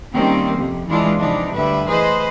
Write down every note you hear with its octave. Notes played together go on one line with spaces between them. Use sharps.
D#3 G3 A#3 C4 C#4
F2 C3
E3 G#3 D4 E4 F4
C3 E3 F3 D4 D#4
D2 G2 D3 G3 B4 E5
E3 G#4 B4 C5 D#5